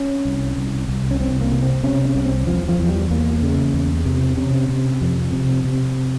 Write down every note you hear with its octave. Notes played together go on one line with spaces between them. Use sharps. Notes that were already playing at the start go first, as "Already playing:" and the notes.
Already playing: C#4
C2
C2
C2
C#4
C2 C4
A#3
C3
C4
C3 C#4
C#4
C2
C4
E2 F3
F3
E2 F3
G3
E2 A#3
C#3
E2
C3
C3 C#4
C3
F2
C3
C3